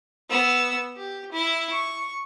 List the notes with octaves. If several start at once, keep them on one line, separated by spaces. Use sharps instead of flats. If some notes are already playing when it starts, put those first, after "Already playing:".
B3 E6
G4
E4
C#6